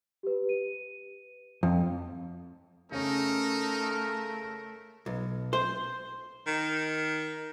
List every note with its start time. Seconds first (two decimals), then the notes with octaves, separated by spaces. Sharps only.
0.23 G4 B4
0.49 D#7
1.63 F2
2.92 C#3 A3 C#4 D#4 A#4
5.06 B1
5.53 C5
6.47 D#3